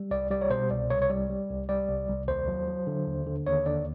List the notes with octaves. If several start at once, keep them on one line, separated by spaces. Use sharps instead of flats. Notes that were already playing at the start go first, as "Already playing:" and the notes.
Already playing: G3
C2 D5
G3 D5
C#5
B2 C5
C2 D5
C2 C#5
C#5
G3 D5
G3
C2
G3 D5
C2
C2
D#2 C5
F#3
F#3
D3
D#2
D3
D#2 C#5
D3 D5